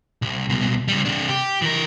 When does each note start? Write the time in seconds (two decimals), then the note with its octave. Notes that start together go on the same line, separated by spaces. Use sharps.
0.22 C2
0.50 C2 B2
0.88 C#3 G3
1.05 C3 D4
1.29 G4
1.62 E3 A#4